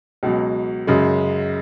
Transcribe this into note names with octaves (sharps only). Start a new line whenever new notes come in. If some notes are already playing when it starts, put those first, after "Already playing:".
C#2 B2 F#3
F#2 C#3 G#3